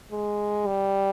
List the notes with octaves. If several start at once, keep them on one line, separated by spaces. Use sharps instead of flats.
G#3
G3